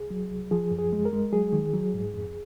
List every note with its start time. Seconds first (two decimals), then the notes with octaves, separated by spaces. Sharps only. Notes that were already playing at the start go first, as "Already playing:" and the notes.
Already playing: C2 G#4
0.10 F#3
0.31 C2
0.51 F3 G#4
0.71 F#2
0.78 G#4
0.93 G#3
1.05 A#4
1.13 G#3
1.32 F#3 G#4
1.53 D#3
1.73 F#3
1.94 G#2
2.14 F2